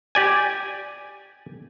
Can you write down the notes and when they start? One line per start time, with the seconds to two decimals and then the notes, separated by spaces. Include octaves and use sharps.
0.15 G4 D5 G#5